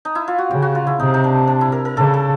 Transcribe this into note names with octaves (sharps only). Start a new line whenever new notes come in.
D#4
E4
F4
F#4
C#3 G4
F#4
F4
E4
C3 D#4
D#4
D4
D4
E4
A#4
A#4
C#3 A4
A4